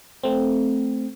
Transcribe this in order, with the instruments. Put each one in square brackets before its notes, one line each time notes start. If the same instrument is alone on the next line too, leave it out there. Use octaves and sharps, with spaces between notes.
[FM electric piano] A3 C4